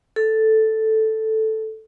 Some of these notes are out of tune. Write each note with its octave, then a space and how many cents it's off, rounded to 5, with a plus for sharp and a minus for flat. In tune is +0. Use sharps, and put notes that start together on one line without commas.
A4 +0